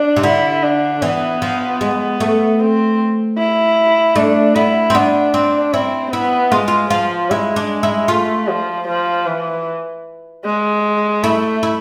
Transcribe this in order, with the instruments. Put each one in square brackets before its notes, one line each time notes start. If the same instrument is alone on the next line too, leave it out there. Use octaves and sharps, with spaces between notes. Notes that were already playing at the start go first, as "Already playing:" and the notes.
Already playing: [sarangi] D4
[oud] C3
[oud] D3 [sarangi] E4
[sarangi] D4
[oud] E3 [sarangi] B3
[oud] F3
G#3
A3
[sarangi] C4
E4
[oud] A3 [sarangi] D4
[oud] B3 [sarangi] E4
[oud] C4
[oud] B3 [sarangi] D4
[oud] C4
[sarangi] C4 [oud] E4
[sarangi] B3 [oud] E4
[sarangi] G#3 [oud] F4
[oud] F4
[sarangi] F3 [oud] F4
[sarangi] G#3 [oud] E4
[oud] D4
E4
[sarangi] A3 [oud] F4
[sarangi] F3
F3
E3
G#3
[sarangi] A3 [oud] E4
[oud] E4